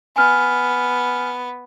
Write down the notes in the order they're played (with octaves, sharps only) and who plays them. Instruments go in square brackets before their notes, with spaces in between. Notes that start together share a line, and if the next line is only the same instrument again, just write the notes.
[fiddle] B3 [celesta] G#5 F6